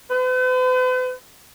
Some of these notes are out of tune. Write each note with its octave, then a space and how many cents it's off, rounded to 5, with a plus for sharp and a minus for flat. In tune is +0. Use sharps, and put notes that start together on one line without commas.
B4 +45